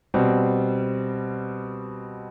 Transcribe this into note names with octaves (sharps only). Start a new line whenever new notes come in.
B2 G3 C4